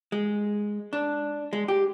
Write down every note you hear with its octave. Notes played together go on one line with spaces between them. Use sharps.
G#3
D4
G#3
G4